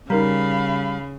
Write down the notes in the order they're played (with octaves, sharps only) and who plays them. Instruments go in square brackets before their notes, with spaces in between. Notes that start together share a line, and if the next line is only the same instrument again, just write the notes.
[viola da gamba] C#3 [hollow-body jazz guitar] G3 [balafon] D#4 A#4 A#5 [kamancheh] F5 B5